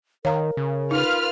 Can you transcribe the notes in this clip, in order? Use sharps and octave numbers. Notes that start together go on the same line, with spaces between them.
D#3 A#4 C#5 F5 A#5
C#3
D#4 F4 B4 F6